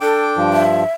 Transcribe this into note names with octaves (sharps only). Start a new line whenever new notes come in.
D4 A4 G5 D6
G2 F3
E5